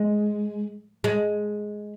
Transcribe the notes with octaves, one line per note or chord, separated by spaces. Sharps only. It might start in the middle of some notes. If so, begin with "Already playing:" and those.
Already playing: G#3
G#3